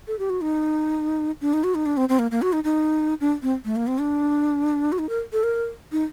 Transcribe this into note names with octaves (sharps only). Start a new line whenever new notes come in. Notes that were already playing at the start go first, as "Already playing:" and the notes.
A4
G4
F#4
D#4
D4
D#4
F#4
D#4
D4
C4
C4
A#3
A#3
F#4
D#4
D#4
D4
C4
A3
A#3
C4
D4
F#4
D#4
A#4
A4
A#4
D#4